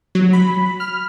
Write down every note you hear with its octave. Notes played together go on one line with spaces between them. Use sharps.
F#3
B5
F6